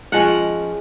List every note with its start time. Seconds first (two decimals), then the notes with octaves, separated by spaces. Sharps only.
0.12 F3 G#3 C#4 F#5